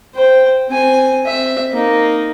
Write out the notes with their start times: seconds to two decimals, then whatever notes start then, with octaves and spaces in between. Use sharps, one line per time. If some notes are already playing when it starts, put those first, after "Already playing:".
0.15 C5 G5
0.68 C4 G#5
1.26 C4 E5
1.72 A#3 D#4